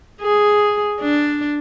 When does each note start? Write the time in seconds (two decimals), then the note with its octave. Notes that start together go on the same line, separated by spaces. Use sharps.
0.22 G#4
1.01 D4